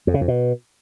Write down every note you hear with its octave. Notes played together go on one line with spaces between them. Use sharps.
F2
C#3
F2
B2